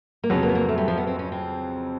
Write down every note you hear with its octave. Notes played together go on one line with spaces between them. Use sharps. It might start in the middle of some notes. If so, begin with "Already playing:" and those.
A#3
F2 C#3 F#3 B3
A#3
B3
A#3
A3
G3
F3
B3
C4
C#4
C4